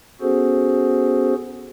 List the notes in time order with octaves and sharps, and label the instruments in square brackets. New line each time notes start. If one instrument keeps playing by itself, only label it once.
[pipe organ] B3 C#4 F#4 G#4 A4 C5